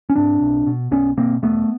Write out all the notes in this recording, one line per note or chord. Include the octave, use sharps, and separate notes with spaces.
C#4
G#2 C4 D4
B1
B2
B1 B3 C#4
B2 A#3 C4
E1 A3 B3